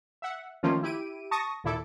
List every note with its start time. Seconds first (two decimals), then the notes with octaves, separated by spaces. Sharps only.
0.22 E5 F#5
0.63 D#3 F3 A3 A#3 C#4 F4
0.83 E4 G4 D7 D#7
1.31 A5 C#6 D#6 A#6
1.64 D#2 A#2 E4 A4 D6